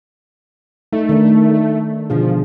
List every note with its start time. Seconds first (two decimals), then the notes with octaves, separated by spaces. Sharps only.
0.93 A3 D#4
1.09 D#3 D4
2.10 B2 D3 F3 G#4